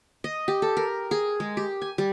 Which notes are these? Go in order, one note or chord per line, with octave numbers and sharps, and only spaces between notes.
D#5
G4
A4
A#4
G#4
G#3
G4
G#5
G3